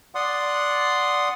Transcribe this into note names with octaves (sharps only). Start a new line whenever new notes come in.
D5 F#5 C6 D#6